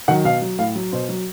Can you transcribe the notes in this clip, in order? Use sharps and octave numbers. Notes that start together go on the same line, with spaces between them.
D#3 F#3 F#5
B2 F5
F#3
A2 F5
F#3
B2 C5
F#3